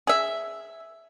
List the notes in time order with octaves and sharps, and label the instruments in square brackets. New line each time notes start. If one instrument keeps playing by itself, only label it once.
[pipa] G#4 E5